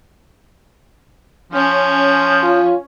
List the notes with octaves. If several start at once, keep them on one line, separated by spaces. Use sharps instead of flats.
F3 C#4
F4